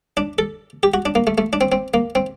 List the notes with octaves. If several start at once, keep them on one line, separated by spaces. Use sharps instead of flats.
D4
A4
G4
F#4
D4
A#3
A3
A3
D4
C4
C4
A#3
C4